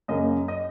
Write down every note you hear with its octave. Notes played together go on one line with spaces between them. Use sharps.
F#2 C#3 A#3 D#5
D#5